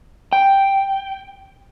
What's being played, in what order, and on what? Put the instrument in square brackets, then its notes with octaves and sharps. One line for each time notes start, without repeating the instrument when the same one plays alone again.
[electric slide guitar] G5